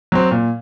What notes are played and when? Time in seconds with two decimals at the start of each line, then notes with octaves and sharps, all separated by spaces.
0.12 F#3 C4
0.31 A#2